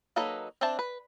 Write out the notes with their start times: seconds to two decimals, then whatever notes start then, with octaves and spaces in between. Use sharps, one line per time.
0.16 F#3 A#3 D#4 A4 B4
0.61 C4 D4 C5 E5 A5
0.79 B4